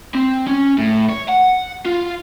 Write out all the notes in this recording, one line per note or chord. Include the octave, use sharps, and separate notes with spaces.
C4
C#4
A2
C#5
F#5
F4